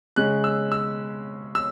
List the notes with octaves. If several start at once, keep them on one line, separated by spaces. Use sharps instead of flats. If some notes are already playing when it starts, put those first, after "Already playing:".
C#3 G#3 C#4 F#6
E6
E6
E6